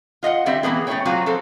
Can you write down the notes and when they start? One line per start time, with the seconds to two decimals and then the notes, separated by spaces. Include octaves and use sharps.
0.23 F4 D#5 F5 F#5
0.46 D3 G3 C4 E5
0.63 E3 A#3 B3 G#4
0.87 A3 C#4 E4 C5 C#5 G5
1.05 F#3 A#3 C4 F4 F#4
1.26 F3 C4 A4 C5